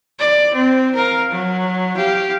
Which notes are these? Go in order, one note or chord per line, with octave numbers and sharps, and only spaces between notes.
D5
C4
A#4 F5
F#3
G4 F5